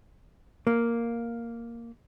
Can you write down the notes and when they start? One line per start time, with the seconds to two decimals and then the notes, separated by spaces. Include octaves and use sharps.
0.67 A#3